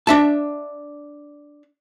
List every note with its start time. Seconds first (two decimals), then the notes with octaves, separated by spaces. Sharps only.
0.07 D4 E5 A5